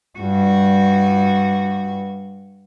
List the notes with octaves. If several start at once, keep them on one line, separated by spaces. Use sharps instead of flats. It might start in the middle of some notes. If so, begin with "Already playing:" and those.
G2 F#4